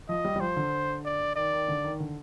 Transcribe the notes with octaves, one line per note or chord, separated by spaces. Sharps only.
F3 D#5
G3
G3
F3 C5
D3
D5
D#3 D5
D#3
D3
D#3
D3